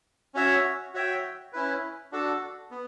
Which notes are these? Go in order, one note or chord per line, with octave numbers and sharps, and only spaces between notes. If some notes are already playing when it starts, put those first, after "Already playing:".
C#4 F#4 C#5 E5
F#4 C#5 E5 G5
C#4 E4 B4
D4 F#4 A4
B3